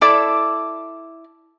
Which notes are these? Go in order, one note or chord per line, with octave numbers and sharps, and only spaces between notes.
E4 A4 D5